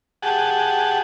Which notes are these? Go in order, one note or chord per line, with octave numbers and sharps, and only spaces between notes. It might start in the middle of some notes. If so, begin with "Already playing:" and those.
G4 G#4 F#5 A5